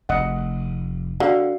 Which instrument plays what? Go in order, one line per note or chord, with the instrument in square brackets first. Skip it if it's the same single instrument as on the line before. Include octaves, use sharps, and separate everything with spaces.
[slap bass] F1 [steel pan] D#5 F#5
[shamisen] D3 [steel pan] F#4 F5 F#5